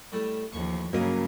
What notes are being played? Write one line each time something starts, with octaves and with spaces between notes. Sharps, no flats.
A2 G3 A3
A1 D#2 F3 C#6
G2 C#3 F#3 A#3 A#4 D#5